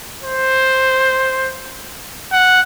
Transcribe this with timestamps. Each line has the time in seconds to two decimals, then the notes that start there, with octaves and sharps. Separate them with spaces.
0.23 C5
2.32 F#5